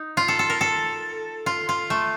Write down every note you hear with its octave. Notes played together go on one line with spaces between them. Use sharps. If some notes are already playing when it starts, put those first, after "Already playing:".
Already playing: D#4
F4
A4
A4
A#4
A4
F4
F4
A3